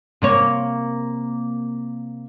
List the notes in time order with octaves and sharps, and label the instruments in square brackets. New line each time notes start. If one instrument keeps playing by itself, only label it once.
[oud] C3 A#3 C#5